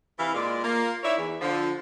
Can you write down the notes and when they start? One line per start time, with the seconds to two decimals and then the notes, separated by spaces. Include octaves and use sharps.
0.19 C3 E3 B4 E5 F5
0.34 A#2 G#3 D5
0.64 A#3 F4
1.04 D#4 E4 B4 C#5 D5 E5
1.17 E2
1.41 D3 F3